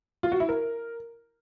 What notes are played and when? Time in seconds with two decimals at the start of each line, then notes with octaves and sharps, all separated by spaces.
0.23 F4
0.32 F#4
0.40 E4
0.49 A#4